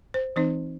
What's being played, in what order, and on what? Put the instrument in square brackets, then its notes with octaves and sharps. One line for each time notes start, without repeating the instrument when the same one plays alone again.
[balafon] C5
E3 C4 D#4 C5